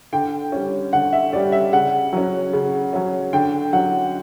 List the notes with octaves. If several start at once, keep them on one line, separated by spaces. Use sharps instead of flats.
D3 G5
G3 C#4
D3 F#5
E5
G3 C#4 D5
E5
C#3 F#5
F#3 C#4
C#3
F#3 C#4
D3 G5
F#3 C#4 F#5